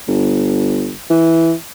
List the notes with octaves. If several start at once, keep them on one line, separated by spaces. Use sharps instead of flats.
G1
E3